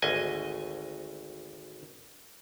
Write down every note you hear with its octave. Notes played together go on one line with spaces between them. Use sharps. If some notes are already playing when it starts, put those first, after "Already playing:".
G#1 D2 D#5 G#5